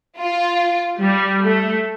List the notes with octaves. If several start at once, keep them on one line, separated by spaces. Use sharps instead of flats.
F4
G3
A3